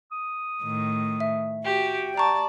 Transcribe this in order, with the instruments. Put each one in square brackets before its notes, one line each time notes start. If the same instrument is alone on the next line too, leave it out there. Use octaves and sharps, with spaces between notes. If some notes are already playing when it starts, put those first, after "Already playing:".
[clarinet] D#6
[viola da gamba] A2 D#3
[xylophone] E5
[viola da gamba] F#4 [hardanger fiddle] G4 [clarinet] G5
[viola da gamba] D5 [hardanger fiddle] A5 [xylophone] A#5 C#6